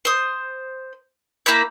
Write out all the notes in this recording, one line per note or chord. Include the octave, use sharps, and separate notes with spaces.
C5 D#6
A#3 E4 B5 G6